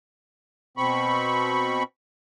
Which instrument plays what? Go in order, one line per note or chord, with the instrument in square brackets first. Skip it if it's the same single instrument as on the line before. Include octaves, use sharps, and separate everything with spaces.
[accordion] B2 C4 B5 C#6